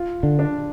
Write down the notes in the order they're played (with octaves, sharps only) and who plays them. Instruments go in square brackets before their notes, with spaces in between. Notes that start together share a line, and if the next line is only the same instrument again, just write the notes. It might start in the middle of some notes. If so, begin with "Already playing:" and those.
Already playing: [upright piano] F4
[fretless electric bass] D3
[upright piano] D4